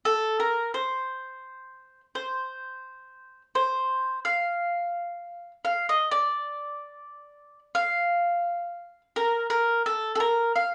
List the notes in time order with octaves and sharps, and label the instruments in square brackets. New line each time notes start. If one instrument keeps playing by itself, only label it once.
[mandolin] A4
A#4
C5
C5
C5
F5
F5
D#5
D5
F5
A#4
A#4
A4
A4
A#4
F5